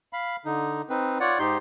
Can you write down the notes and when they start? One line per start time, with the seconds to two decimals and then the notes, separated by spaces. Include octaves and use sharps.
0.13 F5 B5
0.45 D3 D#4
0.89 C4 D#4 B4
1.20 F4 C#5 D5 F#5
1.39 G#2 D#4 G4 C6 G6